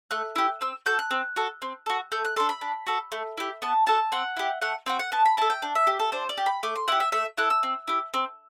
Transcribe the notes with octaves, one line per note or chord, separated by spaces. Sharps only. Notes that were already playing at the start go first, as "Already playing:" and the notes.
A3 F#6
E4 G4
C4 E6
F#4 A4 G6
F#6
C4
F#4 A4
C4
F#4 A4
A3 G6
F#6
D4 A4 C6
B5
D4
F#4 A4
A3
E4 G4
B3 A5
F#4 A4 A5
C4 F#5
E4 G4
A3 F#5
C4 F#4 G5
F#5
B3 A5
B5
E4 A4 A5
G5
D4
E5
G4
A4
D4 C5
D5
G4
B5
A3 D6
C6
E4 G4 F#5
E5
A3 E5
E4 A4 F#6
E6
C4
E4 G4
C4